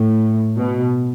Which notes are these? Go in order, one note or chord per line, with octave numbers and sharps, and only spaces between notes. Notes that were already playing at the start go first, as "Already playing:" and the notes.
Already playing: A2
B2